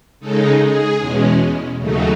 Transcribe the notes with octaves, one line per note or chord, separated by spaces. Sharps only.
C#3 G#3 D#4 A4
G#4
E2 B2 G#3 C#4
D#2 C#3 F#3 A3 D#4